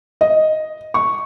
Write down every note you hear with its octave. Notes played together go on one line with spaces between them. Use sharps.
D#5
C#6